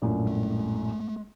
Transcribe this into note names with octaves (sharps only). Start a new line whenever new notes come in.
A#1 F#2 A2
G#3 A3